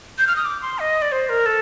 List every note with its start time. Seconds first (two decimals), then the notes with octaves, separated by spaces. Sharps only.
0.18 G6
0.27 F6
0.36 D#6
0.45 D6
0.62 C6
0.79 D#5
1.02 D5
1.12 C5
1.29 A#4
1.46 A4